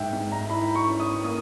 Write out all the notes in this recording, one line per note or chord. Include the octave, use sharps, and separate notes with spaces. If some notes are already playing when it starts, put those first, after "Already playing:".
Already playing: G#2 E5 G5
G#2
A#5
E4 B5
C#6
C#4
D#6
A#3 D#6